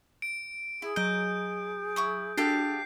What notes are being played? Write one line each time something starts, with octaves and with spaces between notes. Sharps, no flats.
D7
E4 G#4
F#3 D#5 G6 D7
E4 C#6 D#6
D4 F#4 G4 A4 F5 G6 C7